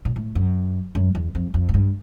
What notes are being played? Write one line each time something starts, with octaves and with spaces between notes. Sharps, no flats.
A#2
A2
F#2
F#2
E2
F2
F2
G#2
G2